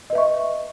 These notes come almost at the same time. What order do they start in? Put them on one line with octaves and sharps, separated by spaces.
D#5 B4 E5 C#6